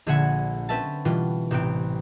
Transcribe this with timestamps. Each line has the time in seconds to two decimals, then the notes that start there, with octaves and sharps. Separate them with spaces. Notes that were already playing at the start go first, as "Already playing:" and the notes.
0.06 A#1 D3 G#4 E5 F#5 G#6
0.69 C4 C#4 B4 E5 A5
1.05 B2 E3 G3 F4
1.51 A1 C3 C4 F#6 D7